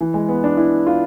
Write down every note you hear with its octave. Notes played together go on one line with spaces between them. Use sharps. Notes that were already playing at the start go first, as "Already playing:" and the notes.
E3
G#3
B3
D4
E4
F4